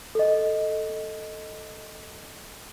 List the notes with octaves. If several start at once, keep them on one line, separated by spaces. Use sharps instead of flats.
A4 D#5